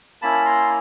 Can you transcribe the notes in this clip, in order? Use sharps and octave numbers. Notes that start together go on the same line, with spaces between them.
A#3 C#4 E4 A5 B5
A#5 C6